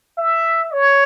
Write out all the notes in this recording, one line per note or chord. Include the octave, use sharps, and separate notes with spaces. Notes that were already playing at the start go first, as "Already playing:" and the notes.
E5
C#5